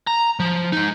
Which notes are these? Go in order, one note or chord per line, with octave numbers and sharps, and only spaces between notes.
A#5
F3
G#3 D#4